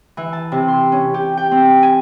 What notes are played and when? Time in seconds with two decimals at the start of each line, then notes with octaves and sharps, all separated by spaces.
0.17 E3
0.33 A5
0.52 C3
0.68 C6
0.92 C#4
1.14 G4
1.37 G5
1.51 C4
1.82 G#5